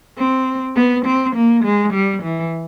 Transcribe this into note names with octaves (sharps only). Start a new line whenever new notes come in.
C4
B3
C4
A#3
G#3
G3
E3